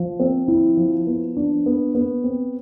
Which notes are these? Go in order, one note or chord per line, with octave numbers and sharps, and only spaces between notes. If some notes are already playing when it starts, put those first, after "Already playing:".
Already playing: F3
C4
E4
F3
B3
D4
B3
B3
C4